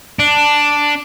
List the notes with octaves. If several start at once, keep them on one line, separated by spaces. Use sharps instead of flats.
D4